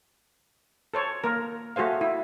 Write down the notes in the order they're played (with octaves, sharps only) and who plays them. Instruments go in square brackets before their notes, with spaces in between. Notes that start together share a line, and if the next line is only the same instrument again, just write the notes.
[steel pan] A4 C5 C#5
A#3 A#4
A3 F#4 G#4 C5 F5
E4